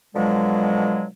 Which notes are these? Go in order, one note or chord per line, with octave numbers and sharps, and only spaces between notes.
B2 D3 F3 F#3 G#3